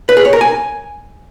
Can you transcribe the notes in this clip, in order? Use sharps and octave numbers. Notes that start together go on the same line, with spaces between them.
B4
G#4
C#5
A#4
G#5